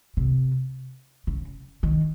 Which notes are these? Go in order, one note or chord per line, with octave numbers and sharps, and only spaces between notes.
C3
C#3
D#3